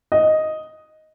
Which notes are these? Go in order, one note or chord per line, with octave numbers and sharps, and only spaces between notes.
D#5